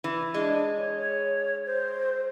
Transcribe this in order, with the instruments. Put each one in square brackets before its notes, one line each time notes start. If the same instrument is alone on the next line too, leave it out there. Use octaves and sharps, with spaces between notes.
[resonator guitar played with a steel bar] E3
[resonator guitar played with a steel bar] G#3 [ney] D4
[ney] C#5
C#5
C5